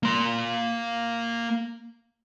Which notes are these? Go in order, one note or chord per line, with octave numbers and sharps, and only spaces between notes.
A#3 C6